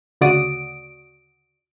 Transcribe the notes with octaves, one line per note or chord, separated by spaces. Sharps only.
D2 C#3 F#4 D5 D#6 D7